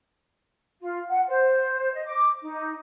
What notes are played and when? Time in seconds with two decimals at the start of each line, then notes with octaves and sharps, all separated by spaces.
0.81 F4
1.09 F#5
1.29 C5
1.93 D#5
2.06 D6
2.43 D#4